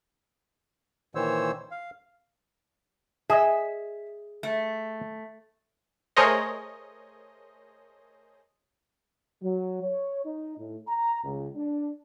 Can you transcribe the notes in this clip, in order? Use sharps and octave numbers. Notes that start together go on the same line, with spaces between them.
A#2 D#3 E3 C5 C#5 E6
F5
G#4 D#5 E5
A3
A3 G#4 A#4 C5 C#5 D#5
F#3
C#5
D#4
A2
A#5
C#2
D4